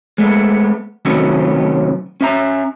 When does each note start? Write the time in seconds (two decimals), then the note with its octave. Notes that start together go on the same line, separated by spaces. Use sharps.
0.18 G#3 A3 B3
1.05 C3 D#3 F#3 A3 B3 C#4
2.21 C#4 E5 A#5